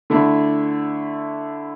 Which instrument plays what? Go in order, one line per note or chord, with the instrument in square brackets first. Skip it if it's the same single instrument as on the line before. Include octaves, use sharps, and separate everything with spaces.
[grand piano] D3 A3 E4